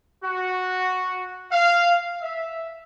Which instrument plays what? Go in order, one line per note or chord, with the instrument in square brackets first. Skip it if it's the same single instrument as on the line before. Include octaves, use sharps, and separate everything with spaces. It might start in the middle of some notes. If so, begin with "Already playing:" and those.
[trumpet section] F#4
F5
E5